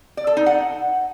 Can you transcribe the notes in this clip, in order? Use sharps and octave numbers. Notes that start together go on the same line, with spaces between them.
D5
A4
D#4
F#5